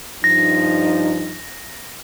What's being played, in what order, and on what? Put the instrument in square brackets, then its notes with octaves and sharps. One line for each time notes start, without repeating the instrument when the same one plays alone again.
[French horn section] G2 F3 D#4 [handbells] A#6